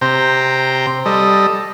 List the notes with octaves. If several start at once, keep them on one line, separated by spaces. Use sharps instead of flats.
C3 C5 G5 A#5
G3 A4 D#5